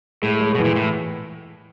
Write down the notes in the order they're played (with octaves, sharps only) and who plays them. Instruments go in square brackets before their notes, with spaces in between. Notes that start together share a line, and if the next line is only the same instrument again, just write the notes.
[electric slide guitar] A2 [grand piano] G#3
[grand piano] G#3
[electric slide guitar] B2 [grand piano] E3
[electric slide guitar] A#2
A2